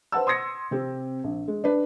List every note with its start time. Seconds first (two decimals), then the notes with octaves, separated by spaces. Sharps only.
0.12 B4 C5 F#5 A5 E6
0.27 C6 D#6 G#6 A#6 C#7
0.71 C3 C4 G4
1.24 A#1
1.48 G#3
1.64 D4 B4